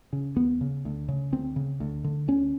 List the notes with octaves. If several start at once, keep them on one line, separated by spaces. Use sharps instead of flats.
C#3
D#2 B3
C#3
D2
C#3
D2 C4
C#3
D2
D3
D2 C#4